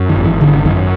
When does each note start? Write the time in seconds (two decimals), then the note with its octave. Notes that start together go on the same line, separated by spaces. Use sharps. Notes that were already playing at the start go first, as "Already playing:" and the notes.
Already playing: F#2
0.09 D#3
0.17 G#1
0.25 E3
0.41 D3 D#3
0.53 D3
0.65 F#2 D#3